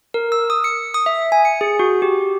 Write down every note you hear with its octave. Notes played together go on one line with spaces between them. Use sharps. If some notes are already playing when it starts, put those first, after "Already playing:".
A#4
E6
D#6
C#7
D#6
E5
G#5
C#7
G#4
F#4
G4